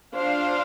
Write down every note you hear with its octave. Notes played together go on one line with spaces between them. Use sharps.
D4 F4 C5 F5